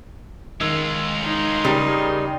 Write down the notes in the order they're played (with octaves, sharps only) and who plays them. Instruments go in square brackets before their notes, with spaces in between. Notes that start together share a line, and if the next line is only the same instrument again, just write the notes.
[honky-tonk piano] D#3 E6 [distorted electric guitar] G#3 F4
[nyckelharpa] D#4 C6
[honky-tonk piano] C#3 A#4 [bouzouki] G3